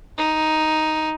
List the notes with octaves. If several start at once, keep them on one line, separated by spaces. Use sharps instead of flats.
D#4